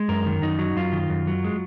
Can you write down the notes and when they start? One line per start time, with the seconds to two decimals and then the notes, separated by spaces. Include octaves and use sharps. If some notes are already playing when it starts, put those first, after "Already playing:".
Already playing: G#3
0.08 F#2 A#4
0.26 D#3
0.42 F#2 D#4
0.59 F#3
0.76 F#2 F4
0.92 D#3
1.10 F#2
1.27 F#3
1.44 G#3